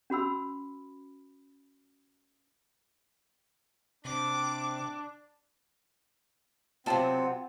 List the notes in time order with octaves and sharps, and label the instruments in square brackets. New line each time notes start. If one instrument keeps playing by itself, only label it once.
[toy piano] C#4 F#4 B5 E6
[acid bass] C3 [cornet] D4 [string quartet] D6
[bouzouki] C3 F#3 B3 [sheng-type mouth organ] C4 [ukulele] F4 A5